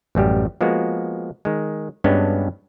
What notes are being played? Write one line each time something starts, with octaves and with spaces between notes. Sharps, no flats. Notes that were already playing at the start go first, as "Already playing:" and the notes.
A1 F#2 G3 G4
F3 G#3 A#3 B3 F#4
D#3 G#3
G2 G#3 B3 C#4 D4 F#4